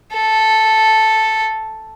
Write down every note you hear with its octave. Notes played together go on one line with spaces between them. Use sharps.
A4